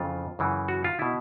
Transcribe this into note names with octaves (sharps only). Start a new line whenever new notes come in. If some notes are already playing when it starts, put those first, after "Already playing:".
Already playing: F2 C#3 E3 F4
F#2 C#3 E3
F#4
F4
B2 E4